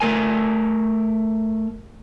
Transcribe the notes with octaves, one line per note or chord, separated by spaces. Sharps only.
A3 A#4 G#5